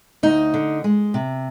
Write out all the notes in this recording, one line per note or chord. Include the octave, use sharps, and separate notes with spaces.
D2 D#4
D3
G#3
C3